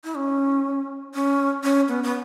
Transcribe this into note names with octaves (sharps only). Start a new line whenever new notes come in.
E4
C#4
C#4
C#4
B3
B3